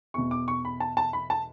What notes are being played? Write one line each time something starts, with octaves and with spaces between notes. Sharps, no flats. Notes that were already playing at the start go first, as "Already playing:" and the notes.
E2 B2 C#6
D6
C#6
B5
A5
A5
B5
A5